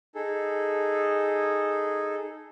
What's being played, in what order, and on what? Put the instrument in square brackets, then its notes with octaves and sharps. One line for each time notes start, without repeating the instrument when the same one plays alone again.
[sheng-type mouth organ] D#4 G#4 A4